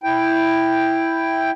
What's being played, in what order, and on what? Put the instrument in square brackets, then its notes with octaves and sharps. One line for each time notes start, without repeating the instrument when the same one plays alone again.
[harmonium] E4 G5